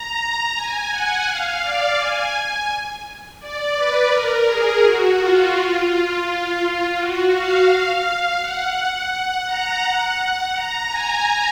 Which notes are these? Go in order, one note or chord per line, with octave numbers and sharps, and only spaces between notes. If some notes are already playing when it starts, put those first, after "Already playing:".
Already playing: A#5
A#5
G#5
F#5
F5
D5
G#5
G#5
D5
B4
A#4
G#4
F#4
F4
F4
F4
F#4
F5
F#5
F#5
A#5
F#5
A#5
G#5